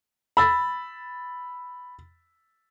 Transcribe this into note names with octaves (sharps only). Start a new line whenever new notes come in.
B5 E6 A6